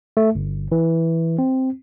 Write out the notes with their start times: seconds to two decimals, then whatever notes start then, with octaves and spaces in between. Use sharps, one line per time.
0.17 A3
0.35 G1
0.72 E3
1.39 C4